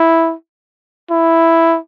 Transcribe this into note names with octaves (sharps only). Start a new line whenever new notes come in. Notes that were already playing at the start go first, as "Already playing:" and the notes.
Already playing: E4
E4